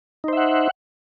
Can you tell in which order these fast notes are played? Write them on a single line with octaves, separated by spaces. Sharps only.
D#4 C5 E5 F#5